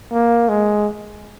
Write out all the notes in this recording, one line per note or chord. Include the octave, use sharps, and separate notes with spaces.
A#3
G#3